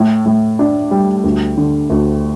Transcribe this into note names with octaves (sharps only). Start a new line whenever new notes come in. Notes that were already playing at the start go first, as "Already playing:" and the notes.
Already playing: A2
A2
D4
G3
D2
D3
D2